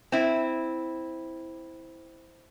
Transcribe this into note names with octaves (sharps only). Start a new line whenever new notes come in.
C4 E4